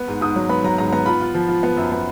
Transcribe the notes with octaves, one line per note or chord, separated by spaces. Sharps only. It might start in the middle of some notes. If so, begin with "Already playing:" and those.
Already playing: B3
G#2
G#2 D#6
F#3
B3 B5
F#3 A#5
G#2 A#5
B3 A#5
F4 B5
F4
F3
F4
B3
F#2
B3